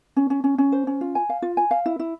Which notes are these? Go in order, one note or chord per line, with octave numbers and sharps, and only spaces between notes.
C#4
C#4
C#4
C#4
C5
C#4
F4
G#5
F5
F4
G#5
F5
E4
E4